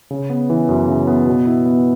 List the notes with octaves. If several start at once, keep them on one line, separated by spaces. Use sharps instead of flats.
C#3
B3
E3
F#2
C#3
B3
B2
E4
B3